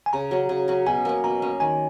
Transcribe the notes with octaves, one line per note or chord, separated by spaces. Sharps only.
G#5
C#3 A#5
F#3 C#4
C#3
F#3 C#4
B2 G#5
A#3 C#4
B2 A#5
A#3 C#4
D#3 G#5